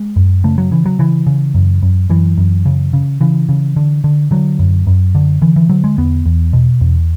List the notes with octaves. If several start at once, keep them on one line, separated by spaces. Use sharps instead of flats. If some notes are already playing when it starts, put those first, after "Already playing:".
Already playing: G#3
F#2
C#3 A3
F#3
C#3 E3
F#3
C#3 E3
C#3
F#2
F#2
F#2 E3
F#2
C#3
C#3
C#3 E3
C#3
D3
D3
D3 F#3
F#2
F#2
D3
D3 E3
E3
D3 F#3
G#3
E2 B3
E2
B2
E2